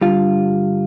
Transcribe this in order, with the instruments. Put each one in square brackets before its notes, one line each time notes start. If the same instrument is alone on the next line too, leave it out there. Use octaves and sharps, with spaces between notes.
[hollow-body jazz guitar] G2 D3 G3 F4